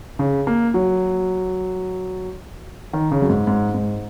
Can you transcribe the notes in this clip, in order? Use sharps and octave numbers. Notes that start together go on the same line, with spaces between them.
C#3
A#3
F#3
D#3
C#3
F#2
G#2
G#2
G#2